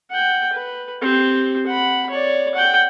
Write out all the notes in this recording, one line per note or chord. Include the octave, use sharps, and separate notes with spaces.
F#5 G5
B4
C4 G4
F#5 B5
C#5 D5
F#5 G5